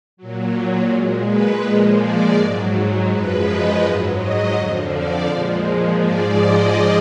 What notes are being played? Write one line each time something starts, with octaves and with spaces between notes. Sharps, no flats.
A#2 F#3
A#2 G#3
B4
A#2 F3 G#3
D5
G#2 F#3
F#2 F3 G#3 B4
D#5
G#2 F#3
D#5
F2 D3 F3
D5
A#2 F3 G#3
G#2 F3 G#3 D5
D#5